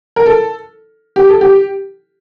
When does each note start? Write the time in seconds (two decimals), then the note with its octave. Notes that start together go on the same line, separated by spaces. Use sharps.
0.16 A#4
0.26 A4
1.16 G4
1.29 A4
1.41 G4